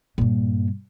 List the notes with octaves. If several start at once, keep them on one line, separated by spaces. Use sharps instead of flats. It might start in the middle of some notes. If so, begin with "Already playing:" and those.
G2 A#2